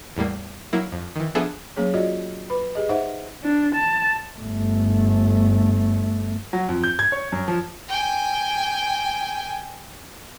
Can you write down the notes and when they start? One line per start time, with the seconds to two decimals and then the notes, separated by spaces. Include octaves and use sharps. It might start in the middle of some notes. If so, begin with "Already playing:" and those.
0.17 E2 A2 G3 A#3
0.73 F#3 A#3 E4
0.92 F2
1.16 D#3 E3
1.35 F3 B3 D4 G#4 A4 E5
1.77 F#3 A#3 C#4 G#4 C#5
1.94 F4 F#4 D5 D#5
2.50 B4 B5
2.75 G4 G#4 D#5
2.89 D#4 C5 E5 F#5
3.43 D4
3.74 A5
4.39 G1 A3
6.53 F#3
6.69 F2
6.84 G6
6.99 G#6
7.12 C#5
7.32 F#2
7.48 F3
7.88 G5 G#5